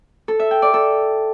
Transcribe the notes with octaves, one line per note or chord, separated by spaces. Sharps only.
A4
E5
G5
D5
A4